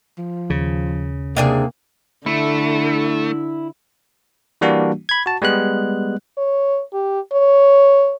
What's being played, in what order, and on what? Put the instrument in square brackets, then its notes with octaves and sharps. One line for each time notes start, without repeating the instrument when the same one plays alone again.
[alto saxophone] F3
[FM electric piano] D#2 [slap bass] C#3
[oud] C3 D4 G#4 [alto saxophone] A#3
[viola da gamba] D3 [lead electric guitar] A3 [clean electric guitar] E4
[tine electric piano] E3 G3 A#3 D4 F#4
B5 G#6
F#4 A5
G3 G#3 B3 F#6
[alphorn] C#5
G4
C#5